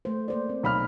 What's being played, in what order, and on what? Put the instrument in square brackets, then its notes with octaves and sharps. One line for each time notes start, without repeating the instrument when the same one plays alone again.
[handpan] A3 C5
A#3 C5 D5
C4
[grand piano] B1 B5 F6